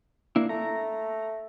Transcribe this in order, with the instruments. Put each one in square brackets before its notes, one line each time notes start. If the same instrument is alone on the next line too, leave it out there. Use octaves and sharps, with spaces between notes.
[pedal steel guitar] A#3 D4 E4
[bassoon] A3 [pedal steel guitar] A#5